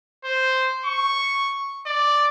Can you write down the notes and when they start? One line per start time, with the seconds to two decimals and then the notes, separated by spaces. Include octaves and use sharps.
0.24 C5
0.85 C#6
1.86 D5